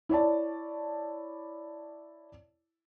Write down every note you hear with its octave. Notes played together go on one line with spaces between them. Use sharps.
E4 C#5 D5 A5